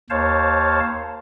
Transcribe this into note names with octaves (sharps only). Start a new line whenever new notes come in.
D#2 C5 C#5 F5 A5